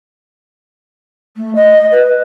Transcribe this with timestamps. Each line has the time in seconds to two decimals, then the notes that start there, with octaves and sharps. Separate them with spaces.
1.36 A3
1.55 D#5
1.91 B4